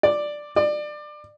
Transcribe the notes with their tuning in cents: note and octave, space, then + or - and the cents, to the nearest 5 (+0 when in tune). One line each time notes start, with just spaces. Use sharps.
D5 +5
D5 +25